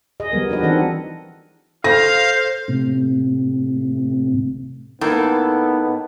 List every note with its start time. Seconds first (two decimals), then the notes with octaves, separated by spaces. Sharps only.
0.20 G#4 D#5
0.32 F3 G3 B3 A#4
0.49 D4 F#4 B4 D#5
0.63 E3 C4 D4 D#4 A4 F#5
1.84 A4 C5 F5 A#6
2.68 A2 C3
5.01 A2 A#3 B3 D#4 A4